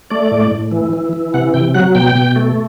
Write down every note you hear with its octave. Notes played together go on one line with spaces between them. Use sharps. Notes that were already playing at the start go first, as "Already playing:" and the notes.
A3 D5
A2
A2
E3
E3
E3
C3 F#5
C3 G5
F#3 F#5
B2 G5
B2
A3